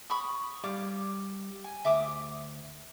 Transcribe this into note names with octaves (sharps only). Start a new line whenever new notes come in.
B5 C#6 D#6
G3 D5 F5 D6
G#5
D2 E5 D6 D#6